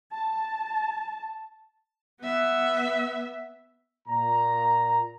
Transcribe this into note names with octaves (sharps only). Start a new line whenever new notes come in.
A5
B3 E5
A#2 A#5